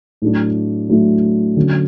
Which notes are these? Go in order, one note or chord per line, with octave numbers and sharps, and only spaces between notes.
A2 F#3 A3 D4
A2 F#3 A3 D4
D3 F#3 C#4